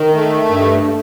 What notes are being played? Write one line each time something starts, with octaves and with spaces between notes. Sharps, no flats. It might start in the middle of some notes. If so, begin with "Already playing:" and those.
Already playing: D#3
A3
G2